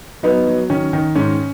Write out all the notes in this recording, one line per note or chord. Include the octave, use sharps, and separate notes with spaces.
F#3 B3 D#4
F#3
D#3 C#4
D#3
G#2 C#4